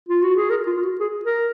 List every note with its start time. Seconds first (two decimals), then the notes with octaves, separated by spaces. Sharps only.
0.09 F4
0.22 F#4
0.36 G#4
0.50 A#4
0.66 F4
0.77 F4
0.83 F#4
1.00 G#4
1.25 A#4